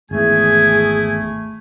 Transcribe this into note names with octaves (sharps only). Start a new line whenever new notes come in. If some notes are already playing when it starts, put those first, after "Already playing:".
G#1 E2 A3 E4 G#4 G#5